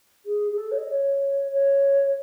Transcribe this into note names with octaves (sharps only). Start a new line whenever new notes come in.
G#4
G#4
A4
C#5
D#5
C#5
C#5